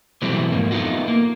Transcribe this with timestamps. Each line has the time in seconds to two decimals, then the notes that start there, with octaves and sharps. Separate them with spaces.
0.22 B2 E3 F#3 G3 A3 C4
0.51 F2 G#2 A#3
0.71 A3 B3 D#4 F4 F#4
1.08 A#3